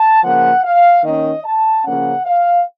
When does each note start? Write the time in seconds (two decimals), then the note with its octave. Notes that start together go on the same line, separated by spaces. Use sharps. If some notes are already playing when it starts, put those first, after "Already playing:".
Already playing: A5
0.23 C#3 F3 A#3 F#5
0.64 F5
1.04 D#3 A#3 C#4 D#5
1.44 A5
1.84 C#3 F3 A#3 C#4 F#5
2.25 F5